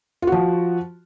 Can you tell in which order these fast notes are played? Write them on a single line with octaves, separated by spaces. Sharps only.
F4 F#4 F3